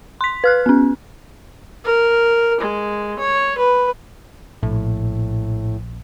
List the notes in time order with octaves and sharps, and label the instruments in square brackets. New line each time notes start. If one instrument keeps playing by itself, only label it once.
[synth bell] C6 B6
B4 F6 F#6
B3 C#4
[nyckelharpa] A#4
G#3
C#5
B4
[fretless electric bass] A#1 [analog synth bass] A2